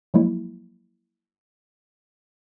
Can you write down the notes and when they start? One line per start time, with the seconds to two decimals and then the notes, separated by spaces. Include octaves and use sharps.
0.14 F3 F#3 G#3 A#3 E4